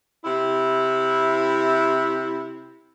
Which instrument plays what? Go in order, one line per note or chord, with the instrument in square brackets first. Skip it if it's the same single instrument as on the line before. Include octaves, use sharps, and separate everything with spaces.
[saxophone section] C3 E4